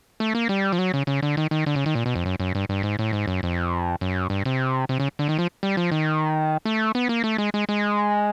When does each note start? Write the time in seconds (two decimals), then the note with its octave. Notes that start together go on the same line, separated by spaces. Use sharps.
0.20 A3
0.35 A#3
0.49 G3
0.72 F3
0.79 F#3
0.94 C#3
1.07 C#3
1.22 D3
1.37 D#3
1.51 D#3
1.66 D3
1.76 C#3
1.86 D#3
1.95 A#2
2.06 B2
2.16 F2
2.26 F#2
2.40 F#2
2.55 G2
2.69 G2
2.83 G#2
2.99 A2
3.13 G#2
3.28 F#2
3.43 F2
4.01 F#2
4.30 G2
4.45 C3
4.89 C3
5.00 C#3
5.19 D3
5.29 D#3
5.39 F3
5.63 G3
5.77 F3
5.92 D#3
6.65 A3
6.95 B3
7.09 A#3
7.24 A3
7.38 G#3
7.54 G#3
7.69 G#3